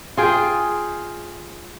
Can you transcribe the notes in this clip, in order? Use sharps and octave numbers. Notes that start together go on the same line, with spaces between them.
F4 G#4 G5